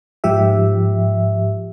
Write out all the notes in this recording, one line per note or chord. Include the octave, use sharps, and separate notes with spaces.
G#2 F3 G4 E5